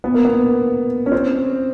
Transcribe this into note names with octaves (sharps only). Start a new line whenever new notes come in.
B3
A#3
B3
C#4
C4